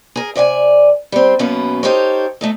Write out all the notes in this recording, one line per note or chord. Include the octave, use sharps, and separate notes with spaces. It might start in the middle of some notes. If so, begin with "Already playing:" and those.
G#4 A#4
C3 D5 E5 G#5
G3 C4
F#2 B2 A#3 B3 C#4
D#4 G4 A4 A#4 C5 C#5
A3 D#4 A4